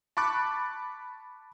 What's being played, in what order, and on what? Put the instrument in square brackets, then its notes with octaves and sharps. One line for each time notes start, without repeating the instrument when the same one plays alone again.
[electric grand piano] A5 B5 C#6 D6 F#6 A6